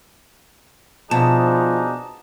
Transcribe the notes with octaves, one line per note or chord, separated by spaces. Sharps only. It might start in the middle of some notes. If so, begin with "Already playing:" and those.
B2 F3 D4 D#4 G#4 A5